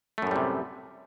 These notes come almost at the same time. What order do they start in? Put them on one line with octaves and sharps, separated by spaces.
A3 F#2 A2 G3 C3